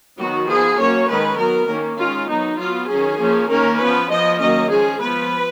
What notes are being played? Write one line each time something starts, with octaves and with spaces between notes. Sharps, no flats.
D#3 F#3 B3 F#4
F3 B3 G#4
F#3 A#3 C#4 C#5
D#3 G#3 C#4 B4
F#3 B3 A#4
D#3 A#3 C#4
D#3 G#3 C#4 F4
F#3 B3 D#4
F#3 B3 F4
D#3 F#3 C#4 G#4
F3 A#3 C#4
D#3 A#3 C#4 A#4
F3 B3 B4
F3 B3 D#5
D#3 F#3 A#3 C#4 D#5
F3 G#3 C#4 G#4
F3 B3 B4